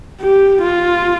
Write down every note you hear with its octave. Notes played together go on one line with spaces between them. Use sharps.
G4
F4